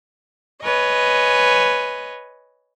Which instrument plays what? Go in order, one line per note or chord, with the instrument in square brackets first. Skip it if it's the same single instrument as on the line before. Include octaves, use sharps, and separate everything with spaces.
[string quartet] B4 C#5 D#5 G#5